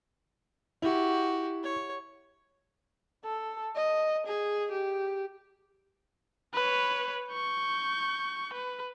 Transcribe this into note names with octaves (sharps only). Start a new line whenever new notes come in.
E4 F#4 G4
C#5
A4
D#5
G#4
G4
B4 C#5
C#6 G6
B4